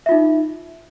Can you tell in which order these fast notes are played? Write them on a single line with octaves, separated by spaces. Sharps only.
E5 F4 D#4